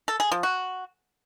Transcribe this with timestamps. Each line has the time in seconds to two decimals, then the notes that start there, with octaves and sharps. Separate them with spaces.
0.08 A4
0.20 G#4
0.31 F3
0.43 F#4